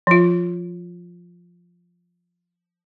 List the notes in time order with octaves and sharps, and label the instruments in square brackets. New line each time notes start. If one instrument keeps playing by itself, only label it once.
[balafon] F3 F4